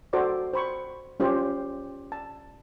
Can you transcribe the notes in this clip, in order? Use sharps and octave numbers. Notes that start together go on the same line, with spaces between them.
F#4 A4 C5 D5 D6
C5 B5 C#6
C#4 F4 G4 C5 C#5
A5